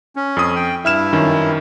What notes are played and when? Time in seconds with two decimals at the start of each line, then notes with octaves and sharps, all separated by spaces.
0.16 C#4
0.37 F2 D#6
0.56 G5
0.85 G2 E4 E5 F6 E7
1.13 F#2 D#3 C#4